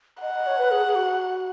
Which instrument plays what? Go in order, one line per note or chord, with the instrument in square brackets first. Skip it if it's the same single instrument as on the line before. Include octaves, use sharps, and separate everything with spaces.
[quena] D#5 [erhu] F#5
[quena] D#5
C#5
B4
G#4
G#4
F#4